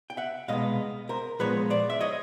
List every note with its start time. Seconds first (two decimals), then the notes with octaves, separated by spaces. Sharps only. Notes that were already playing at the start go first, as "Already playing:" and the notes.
0.10 G5
0.17 E5 F#5
0.48 C2 B2 G#3 B3 D#5 F5
1.09 A#4 C5
1.39 A#2 F3 G#3 B3 B4 C#5
1.70 C5 D5
1.90 E5
2.01 C#5 D#5